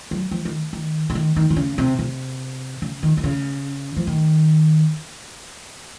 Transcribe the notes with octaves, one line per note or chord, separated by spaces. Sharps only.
F#3
F3
D#3
D#3
C#3
D#3
D#3
D#3
C#3
C3
C3
C#3
D#3
D#3
C#3
F3
D#3